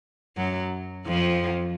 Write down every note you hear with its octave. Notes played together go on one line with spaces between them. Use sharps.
F#2 F#3
F2 F3